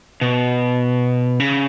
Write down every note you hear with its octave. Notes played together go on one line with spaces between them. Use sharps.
B2
C#3